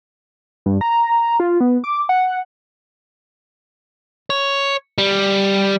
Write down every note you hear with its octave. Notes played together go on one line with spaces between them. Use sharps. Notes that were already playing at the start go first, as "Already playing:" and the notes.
G2
A#5
F4
B3
D6
F#5
C#5
G3